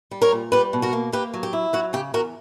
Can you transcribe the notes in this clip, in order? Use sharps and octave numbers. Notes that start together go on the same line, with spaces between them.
G3
A#4 C#5
A#2
G3 G4 B4
B2
F#4 A#4
A#3
A#3 G4 B4
F#3
G4
E4
F#3 F#4
C#3 G4
E2 F#4 A#4